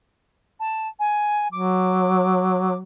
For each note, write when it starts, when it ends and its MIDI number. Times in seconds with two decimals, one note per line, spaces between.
0.60 0.88 81
0.99 1.48 80
1.52 2.82 54
1.52 2.77 86